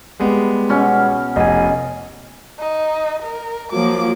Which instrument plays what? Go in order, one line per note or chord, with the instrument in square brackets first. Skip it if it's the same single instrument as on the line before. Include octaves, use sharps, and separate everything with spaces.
[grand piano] G3 G#3 B3
[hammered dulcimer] B2 C#4
[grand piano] F1 [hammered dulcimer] D#5 G#5
[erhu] D#4
A#4
[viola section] F3 F#3 A#3 [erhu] D6